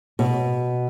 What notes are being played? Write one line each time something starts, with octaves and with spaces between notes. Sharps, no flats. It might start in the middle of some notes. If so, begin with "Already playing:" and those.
B2